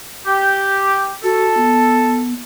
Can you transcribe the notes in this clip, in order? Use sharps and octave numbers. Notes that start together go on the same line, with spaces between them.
G4
F#4 A4
B3